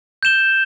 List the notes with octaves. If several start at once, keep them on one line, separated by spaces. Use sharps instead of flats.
G6 E7 G7